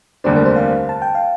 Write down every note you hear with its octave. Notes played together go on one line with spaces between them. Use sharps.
F1 D#2 D3 G3 D4 C5
A#4
C5
F5
A5
G5
F5